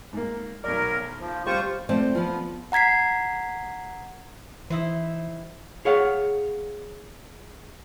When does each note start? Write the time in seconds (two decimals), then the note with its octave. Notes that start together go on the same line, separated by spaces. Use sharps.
0.13 G#2 A#3
0.64 B1 F#3 A#4 D5
1.19 F3
1.46 G3 F4 G4 C5 C#6
1.89 F3 A3 C4 C5 D5
2.15 F3 B3 F4
2.72 F#5 A#5 G#6 B6 C7
4.70 E3 D#4 E4 C5
5.85 G#4 C#5 F5 F#5